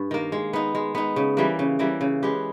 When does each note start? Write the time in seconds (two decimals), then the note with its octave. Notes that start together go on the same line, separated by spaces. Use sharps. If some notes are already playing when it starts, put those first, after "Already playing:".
Already playing: G2
0.11 D#3 A#3
0.32 G#3
0.53 B3 D#4
0.75 G#3
0.95 B3 D#4
1.16 C#3
1.37 E3 G3 A#3
1.59 C#3
1.79 E3 G3 A#3
2.01 C#3
2.23 G#3 B3 G4